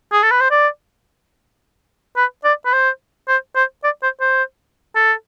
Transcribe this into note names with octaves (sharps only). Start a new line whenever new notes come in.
G#4
A4
B4
C5
D5
B4
D5
B4
C5
C5
C5
D5
C5
C5
A4